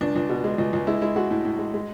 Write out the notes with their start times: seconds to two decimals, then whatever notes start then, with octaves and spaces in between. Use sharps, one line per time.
0.01 C#2 D4
0.16 C#2
0.29 B2
0.44 G#3
0.58 C#2
0.73 C#2
0.87 G#3 E4
1.02 G#3 E4
1.16 G#3 F#4
1.31 A2
1.45 A2
1.59 G#3
1.74 G#3